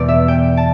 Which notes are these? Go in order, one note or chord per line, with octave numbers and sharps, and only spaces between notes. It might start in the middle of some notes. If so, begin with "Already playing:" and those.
Already playing: E2 B2 G3 B3 B4 D5
E5
G5
A5